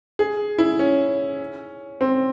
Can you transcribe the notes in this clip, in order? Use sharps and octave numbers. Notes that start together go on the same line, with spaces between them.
G#4
E4
C#4
C4